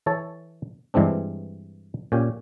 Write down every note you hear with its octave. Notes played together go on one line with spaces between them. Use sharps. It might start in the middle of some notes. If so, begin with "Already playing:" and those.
E3 A4 C#5 A5
G2 E3 G#3 C4 D4
A#2 C#4 G4